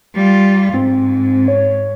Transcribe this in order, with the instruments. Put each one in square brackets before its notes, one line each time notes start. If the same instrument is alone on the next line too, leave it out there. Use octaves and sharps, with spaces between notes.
[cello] G3 F4
[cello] G#2 [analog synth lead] C4
[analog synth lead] C#5